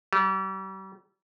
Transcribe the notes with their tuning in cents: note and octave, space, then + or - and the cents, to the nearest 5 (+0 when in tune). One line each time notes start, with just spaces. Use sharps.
G3 -40